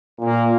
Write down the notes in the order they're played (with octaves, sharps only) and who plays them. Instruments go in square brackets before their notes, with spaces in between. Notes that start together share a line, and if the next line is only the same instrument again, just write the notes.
[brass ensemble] A#2 A#3